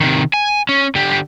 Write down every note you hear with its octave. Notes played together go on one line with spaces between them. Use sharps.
C3 D#3
G#5
C#4
D3 G4